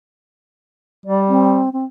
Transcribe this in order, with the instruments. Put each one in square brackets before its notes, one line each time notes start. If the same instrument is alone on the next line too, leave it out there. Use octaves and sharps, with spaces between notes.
[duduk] G3 [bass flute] D5
[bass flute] C4
C4